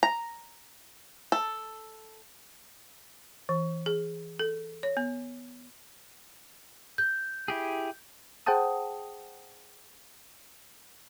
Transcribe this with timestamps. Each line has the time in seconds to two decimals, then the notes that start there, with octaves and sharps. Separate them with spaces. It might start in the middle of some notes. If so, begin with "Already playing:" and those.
0.03 A#5
1.32 A4
3.49 E3
3.86 G#4
4.39 A4
4.83 C#5
4.97 B3
6.98 G6
7.48 E4 G4 G#4
8.46 G#4 C5 F#5 G5 A5 D#6